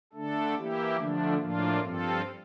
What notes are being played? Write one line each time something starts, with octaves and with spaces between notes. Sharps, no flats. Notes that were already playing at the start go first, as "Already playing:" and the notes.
D3 A3 D4 A4
E3 A#3 E4 G4
D3 F3 A3 D4
A2 F3 A#3 D4 F4
G2 F3 C4 F4 A4